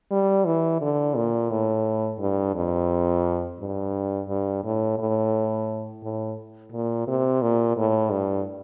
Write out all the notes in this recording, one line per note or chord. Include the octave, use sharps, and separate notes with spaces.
G3
E3
D3
A#2
A2
G2
F2
G2
G2
A2
A2
A2
A#2
C3
A#2
A2
G2